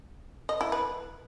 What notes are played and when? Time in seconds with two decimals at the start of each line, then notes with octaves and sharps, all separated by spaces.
0.49 D#5
0.61 E4
0.72 B4